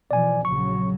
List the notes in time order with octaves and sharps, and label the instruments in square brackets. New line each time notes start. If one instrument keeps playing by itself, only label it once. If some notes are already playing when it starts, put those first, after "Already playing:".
[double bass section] B2 E3 F3 [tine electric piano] D5 G#5
[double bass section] A#1 C#3 F#3 [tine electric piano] C#6